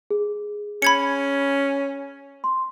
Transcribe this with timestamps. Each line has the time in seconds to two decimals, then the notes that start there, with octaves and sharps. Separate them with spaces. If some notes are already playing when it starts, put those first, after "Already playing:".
0.11 G#4
0.82 C#4 B5 G#6 C#7
2.44 C6